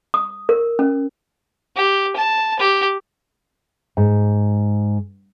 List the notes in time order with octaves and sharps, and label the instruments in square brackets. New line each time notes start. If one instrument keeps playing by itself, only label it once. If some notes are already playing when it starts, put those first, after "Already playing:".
[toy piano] D#6
A#4
C#4
[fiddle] G4
A5
G4
[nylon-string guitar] G#2